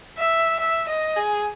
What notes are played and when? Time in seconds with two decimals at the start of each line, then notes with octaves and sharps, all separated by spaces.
0.17 E5
0.60 E5
0.89 D#5
1.16 G#4